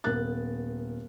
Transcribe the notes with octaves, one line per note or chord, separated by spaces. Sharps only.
D#1 B3 A#4 F#6 A6